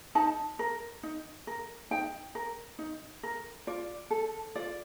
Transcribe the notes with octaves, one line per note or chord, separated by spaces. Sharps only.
D#4 A5
A#4
D#4
A#4
D#4 G5
A#4
D#4
A#4
F4 D5
A4
F4 D5